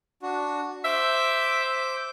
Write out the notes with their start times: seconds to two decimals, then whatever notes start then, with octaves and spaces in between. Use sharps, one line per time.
0.22 D4 F#4
0.84 C5 E5 D6 G6